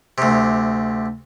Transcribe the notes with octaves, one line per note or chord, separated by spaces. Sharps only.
D2 C3